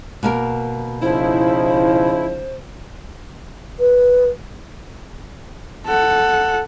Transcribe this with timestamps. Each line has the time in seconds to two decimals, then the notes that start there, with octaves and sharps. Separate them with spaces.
0.23 B2 A#3 A#4
1.02 C#3 F3 D#4 E4 C5
3.78 B4
5.86 A4 F#5